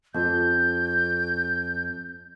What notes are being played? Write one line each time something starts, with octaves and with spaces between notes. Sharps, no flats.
F2 G6